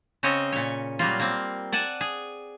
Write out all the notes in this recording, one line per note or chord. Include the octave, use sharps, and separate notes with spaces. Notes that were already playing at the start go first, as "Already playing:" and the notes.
C#3 C4 C#4 C#5 D#5
A#2 C#5
F#3 G3 A#3 F4
A#3 C4
D5 F#5 G#5 A5
G#4